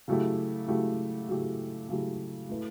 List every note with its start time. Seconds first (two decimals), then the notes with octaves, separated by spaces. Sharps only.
0.08 C#3 F#3 A3 E4 G4
0.68 C#3 F#3 A3 E4 G4
1.29 C#3 F#3 A3 E4 G4
1.89 C#3 F#3 A3 E4 G4
2.49 A3 E4 B4